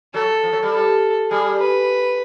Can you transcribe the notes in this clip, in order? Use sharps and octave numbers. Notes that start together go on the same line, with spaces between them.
F#3 A4
F3
F#3
G3
A4
G3 G#4
B4